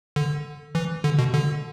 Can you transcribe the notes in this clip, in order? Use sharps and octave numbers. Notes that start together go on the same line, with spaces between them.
D3
E3
D3
B2
D3